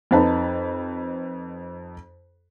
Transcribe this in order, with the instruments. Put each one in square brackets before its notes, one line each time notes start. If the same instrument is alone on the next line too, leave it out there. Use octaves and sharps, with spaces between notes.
[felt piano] F2 D#4 B4 A5